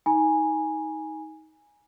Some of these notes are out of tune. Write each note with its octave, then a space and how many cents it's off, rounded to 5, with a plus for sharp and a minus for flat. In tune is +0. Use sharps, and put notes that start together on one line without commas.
D#4 +20 G#5 -5 B5 -45